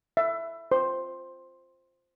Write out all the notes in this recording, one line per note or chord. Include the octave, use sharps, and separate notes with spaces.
E5
C5